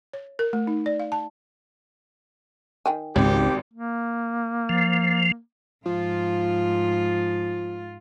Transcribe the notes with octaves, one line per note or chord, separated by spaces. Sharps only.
C#5
A#4
A3
D#4
D5
F5
A5
D#3 G5 G#5
G#1 C#2 G4
A#3
F3
G#2 F3 F4